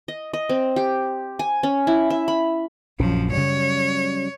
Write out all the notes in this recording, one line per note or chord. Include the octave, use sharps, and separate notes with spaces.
D#5
D#5
C4
G4
G#5
C#4
E4
E5
B5
A#1 F#2 F3 C#4
C#3 F#3 G3 C#5